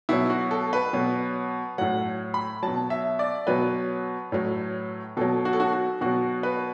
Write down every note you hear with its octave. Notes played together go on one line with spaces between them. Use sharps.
B2 F#3 E4
F#4
A4
B4
B2 F#3
A2 F#3 F#5
B5
B2 F#3 A5
E5
D5
B2 F#3 B4
A2 F#3
B2 F#3 A4
F#4
A4
F#4
F#4
B2 F#3 F#4
B4